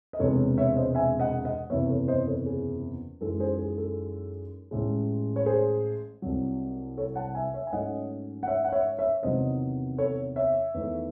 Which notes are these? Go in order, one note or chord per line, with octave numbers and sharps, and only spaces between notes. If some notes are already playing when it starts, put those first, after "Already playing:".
D#5
E1 E2 C3 E3 G#3 A4 C#5
C#5 E5
C5 D#5
E5 G#5
D#5 F#5
D#5 F#5
F#1 E2 C3 E3 C#5 E5
A4 C#5
C5 D#5
A4 C#5
G#4
F#2 E3 G#3 D#4 A4
G#4 C5
G#4
A4
A1 A2 G#3
C#5
G#4 C5
C2 C3 F#3
A4 C#5
F#5 A5
E5 G#5
C#5 E5
G#5
G#2 F#3 A3 C#4 D#5 F#5
F#5
C#5 E5
F#5
C#5 E5
C#5 E5
E2 C3 D#3 F#3 C5 D#5
A4 C#5
C#5 E5
E2 D#3 A3